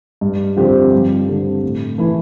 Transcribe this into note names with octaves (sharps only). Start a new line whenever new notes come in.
G2
D3 F3 C4 G4
G2
D3 G3 C4
A2
E3 A3 E4